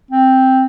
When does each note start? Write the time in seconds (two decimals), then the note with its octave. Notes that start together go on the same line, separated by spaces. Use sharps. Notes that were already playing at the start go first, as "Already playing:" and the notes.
0.11 C4